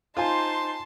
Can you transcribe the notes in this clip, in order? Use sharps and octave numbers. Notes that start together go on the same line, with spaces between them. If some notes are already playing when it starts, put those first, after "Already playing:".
D#4 F4 C5 G#5 A5 C6